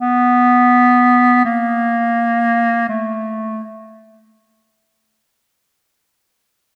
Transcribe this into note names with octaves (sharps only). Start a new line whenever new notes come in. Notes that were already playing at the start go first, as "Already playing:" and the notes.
B3
A#3
A3